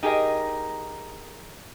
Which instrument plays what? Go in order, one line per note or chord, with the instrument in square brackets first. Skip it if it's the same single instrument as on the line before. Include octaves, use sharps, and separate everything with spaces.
[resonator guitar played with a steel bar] D#4 G4 G#4 A#4 D#5